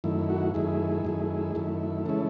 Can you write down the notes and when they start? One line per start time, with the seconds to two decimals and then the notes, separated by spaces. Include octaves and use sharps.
0.04 F#2 D#3 A3 E4
0.30 F#4
0.54 F#2 D#3 A3 E4 G#4
1.05 F#2 D#3 A3 E4
1.55 F#2 D#3 A3 E4
2.05 C#3 E3 G#3 C#4 E4 A4